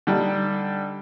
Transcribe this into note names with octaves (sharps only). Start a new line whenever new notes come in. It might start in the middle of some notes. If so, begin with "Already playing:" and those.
D3 G3 D4 D#4